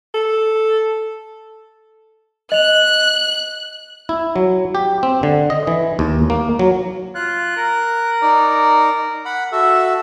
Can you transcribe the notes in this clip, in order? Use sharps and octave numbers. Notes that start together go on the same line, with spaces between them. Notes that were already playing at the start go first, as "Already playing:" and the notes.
A4
D#5 F#6 F7
E4
F#3
G4
C4
D3
D#5
E3
D#2
A#3
F#3
F4 F#6
A#4
D#4 D5
F#5 B5
F#4 A4 E5 E6